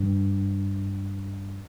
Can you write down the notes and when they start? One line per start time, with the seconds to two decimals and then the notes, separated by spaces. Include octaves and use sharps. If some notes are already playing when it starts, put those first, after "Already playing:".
Already playing: G2